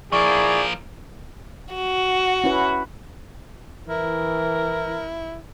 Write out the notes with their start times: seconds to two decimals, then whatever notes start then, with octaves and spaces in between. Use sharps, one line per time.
0.12 F3 E4 G#4 A#4 D5 C#6
1.74 F#4
2.44 C#4 E4 B4
3.88 E3 E4 A#4